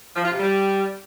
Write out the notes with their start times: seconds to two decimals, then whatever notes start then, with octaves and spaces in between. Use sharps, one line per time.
0.16 F3
0.24 F4
0.32 C3
0.40 G3